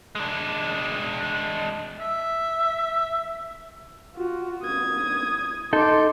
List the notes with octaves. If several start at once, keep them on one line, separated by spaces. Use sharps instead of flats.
G#3 D4
E5
F4 F#4
D#6 G#6
D#4 A4 C6 D6